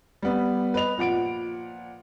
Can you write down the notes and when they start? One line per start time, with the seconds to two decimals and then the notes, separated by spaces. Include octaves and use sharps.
0.22 G3 B3
0.74 B4 D#5 F7
0.98 A#2 F3 F#5 D7